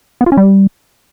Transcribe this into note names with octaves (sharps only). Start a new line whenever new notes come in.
B3
F4
C#4
G3